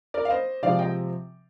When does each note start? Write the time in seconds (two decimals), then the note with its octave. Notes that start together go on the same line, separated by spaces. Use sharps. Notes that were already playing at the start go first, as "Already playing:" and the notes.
0.14 A#4 D5
0.25 F5
0.30 C5 D#5
0.62 C3 F3 G#3 C4 D5 F5
0.79 D#5 G5